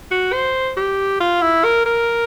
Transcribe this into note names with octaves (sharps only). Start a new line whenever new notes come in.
F#4
C5
G4
F4
E4
A#4
A#4